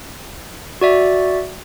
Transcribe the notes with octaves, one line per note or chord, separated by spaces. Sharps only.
F#4 D5 E5